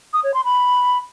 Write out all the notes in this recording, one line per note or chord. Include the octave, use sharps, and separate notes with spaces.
D#6
C#5
C6
B5